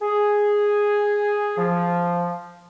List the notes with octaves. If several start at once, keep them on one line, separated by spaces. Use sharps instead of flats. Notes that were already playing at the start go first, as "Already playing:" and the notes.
G#4
F3